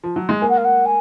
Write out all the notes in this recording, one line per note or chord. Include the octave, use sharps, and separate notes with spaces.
F3
F#3
G#3
A#3 G#5
F#5
F5
F#5
G#5